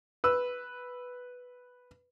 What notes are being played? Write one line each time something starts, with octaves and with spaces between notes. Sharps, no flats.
B4 E6